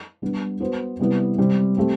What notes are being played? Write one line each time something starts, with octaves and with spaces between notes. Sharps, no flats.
G3 B3 D4
B3 F#4 C5
C3 G3 B3 E4
C3 G3 C4
A3 C4 G4